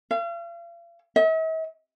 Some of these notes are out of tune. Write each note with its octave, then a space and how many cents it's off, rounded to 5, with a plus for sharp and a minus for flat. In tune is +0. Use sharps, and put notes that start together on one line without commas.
F5 -40
E5 -45